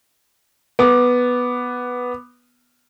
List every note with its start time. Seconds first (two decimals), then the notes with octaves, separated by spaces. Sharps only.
0.79 B3 D6